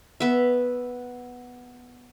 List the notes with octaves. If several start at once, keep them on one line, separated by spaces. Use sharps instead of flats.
B3 E5